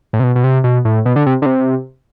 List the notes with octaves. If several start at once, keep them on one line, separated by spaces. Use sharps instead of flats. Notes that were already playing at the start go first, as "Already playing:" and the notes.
A2
C3
B2
B2
C3
B2
A2
B2
D3
C3
D3
C3